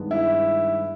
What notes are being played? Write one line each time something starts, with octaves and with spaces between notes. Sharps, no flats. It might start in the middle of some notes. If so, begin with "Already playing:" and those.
Already playing: G2 D#3 G#3 B3
E4